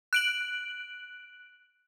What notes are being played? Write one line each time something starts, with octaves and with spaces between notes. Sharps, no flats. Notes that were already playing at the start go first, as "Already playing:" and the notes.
F#6 D7 F#7